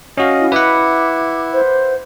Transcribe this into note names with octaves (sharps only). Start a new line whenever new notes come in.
C#4 F#4 D#5 F5
E4
E4 B4 F#5 D6
C5